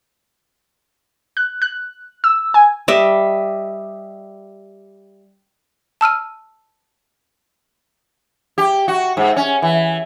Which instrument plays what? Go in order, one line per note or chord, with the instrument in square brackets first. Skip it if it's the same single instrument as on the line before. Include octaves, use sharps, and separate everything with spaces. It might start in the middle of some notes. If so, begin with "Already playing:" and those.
[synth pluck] F#6
F#6
E6
G#5
[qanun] G3 D#5 E5
[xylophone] A5 E6 F6 D#7
[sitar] G4
F#4
G#2
C#4
E3